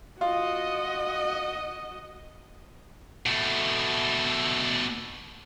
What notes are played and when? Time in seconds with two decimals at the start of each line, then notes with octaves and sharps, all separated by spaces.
0.21 F4 F#4 D#5
3.26 B2 A3